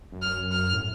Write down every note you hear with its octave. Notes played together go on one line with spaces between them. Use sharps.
F#2
F6
F6
A2